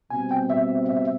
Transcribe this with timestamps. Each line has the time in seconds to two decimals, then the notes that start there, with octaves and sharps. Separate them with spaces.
0.10 B2 G3 C4 G#5
0.31 G5
0.50 E5
0.89 E5
0.99 E5